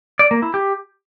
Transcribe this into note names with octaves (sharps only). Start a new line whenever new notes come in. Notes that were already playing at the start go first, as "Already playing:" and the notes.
D5
A#3
E4
G4